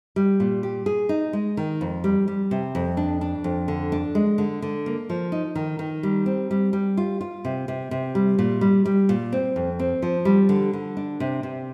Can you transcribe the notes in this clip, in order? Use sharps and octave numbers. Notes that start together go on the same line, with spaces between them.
G3
A#2
G4
G#4
D#4
G#3
D#3
F2
G3
G3
C3
F2
D4
D4
F2
D3
D4
G#3
D3
D3
A#3
F3
D#4
D#3
D#3
G3
C4
G3
G3
F4
F4
C3
C3
C3
G3
A#2
G3
G3
A#2
C4
F2
C4
F3
G3
D3
D3
D4
C3
C3